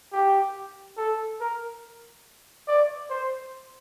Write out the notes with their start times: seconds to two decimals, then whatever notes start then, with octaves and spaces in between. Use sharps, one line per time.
0.13 G4
0.98 A4
1.40 A#4
2.68 D5
3.10 C5